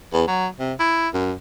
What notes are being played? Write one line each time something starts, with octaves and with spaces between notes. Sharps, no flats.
E2
F#3
C3
E4
F#2